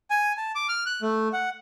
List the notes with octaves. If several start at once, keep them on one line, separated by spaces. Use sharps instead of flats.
G#5
A5
D6
F6
F#6
A3
F#5